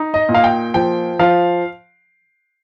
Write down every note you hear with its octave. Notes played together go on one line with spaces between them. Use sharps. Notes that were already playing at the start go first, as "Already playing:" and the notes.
Already playing: D#4
D#5
A#2
F5
G5
F3 G5
F3 F5